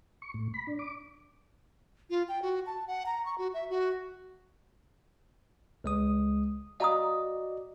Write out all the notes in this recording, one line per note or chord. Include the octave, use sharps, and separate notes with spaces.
C#6
A2
B5
D4
D6
F4
G5
F#4
A5
F#5
A#5
C#6
F#4
E5
F#4
C#2 G#3 D#6
F#4 D5 D#5 F5 A#5 D#6